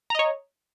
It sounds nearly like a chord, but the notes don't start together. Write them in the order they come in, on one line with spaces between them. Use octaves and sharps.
A#5 D#5 C#5